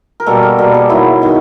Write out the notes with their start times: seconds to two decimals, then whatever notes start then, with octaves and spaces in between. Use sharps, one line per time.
0.20 A#4
0.26 B2 G3 A#3 A4
0.43 A#4
0.58 B2 G3 A#3 A4
0.74 G#4
0.89 D#3 F#3 B3 E4
1.22 D#3 F#3 B3